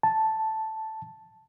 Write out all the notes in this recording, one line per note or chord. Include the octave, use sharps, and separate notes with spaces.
A5